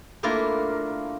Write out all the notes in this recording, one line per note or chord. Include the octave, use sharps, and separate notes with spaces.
A3 A#3 D4 E4 F4 A#4